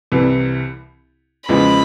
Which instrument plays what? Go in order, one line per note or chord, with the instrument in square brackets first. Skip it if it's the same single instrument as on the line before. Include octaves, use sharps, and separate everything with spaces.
[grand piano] C2 C3 E3
[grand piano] E2 C#3 F3 G#3 [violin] B5